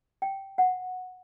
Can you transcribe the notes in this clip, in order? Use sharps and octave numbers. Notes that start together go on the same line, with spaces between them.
G5
F#5